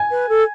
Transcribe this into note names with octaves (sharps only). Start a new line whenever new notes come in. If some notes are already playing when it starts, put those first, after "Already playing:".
Already playing: G#5
B4
A4